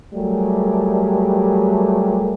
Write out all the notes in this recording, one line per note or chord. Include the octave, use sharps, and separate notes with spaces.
F#3 G3 A3 G4 G#4 A#4